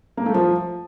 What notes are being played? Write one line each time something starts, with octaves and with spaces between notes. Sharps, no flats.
A#3
A3
F3